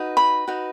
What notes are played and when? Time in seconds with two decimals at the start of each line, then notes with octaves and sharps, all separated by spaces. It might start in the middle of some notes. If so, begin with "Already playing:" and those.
Already playing: D#4 F#4 B4
0.17 B5
0.48 D#4 F#4 B4